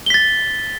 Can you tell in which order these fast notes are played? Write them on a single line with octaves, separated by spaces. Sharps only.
G7 B6 A6